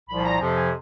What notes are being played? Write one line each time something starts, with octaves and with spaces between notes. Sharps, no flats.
C2 A#2 F3 B5
A#5
F2 C3 F3
G#5